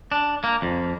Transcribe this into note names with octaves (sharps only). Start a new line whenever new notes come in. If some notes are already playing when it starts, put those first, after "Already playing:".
D4
A#3
F2